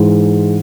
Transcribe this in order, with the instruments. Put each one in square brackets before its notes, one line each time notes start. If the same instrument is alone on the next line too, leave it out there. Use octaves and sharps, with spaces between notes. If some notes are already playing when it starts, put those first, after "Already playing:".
Already playing: [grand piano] G#2 E3 G#3